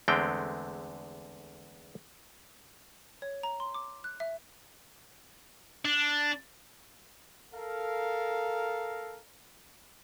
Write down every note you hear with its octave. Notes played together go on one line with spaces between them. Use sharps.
E2 D3 G#3 A3 C4 G5
C#5
A#5
C6
D6
F#6
E5
D4
A4 A#4 F5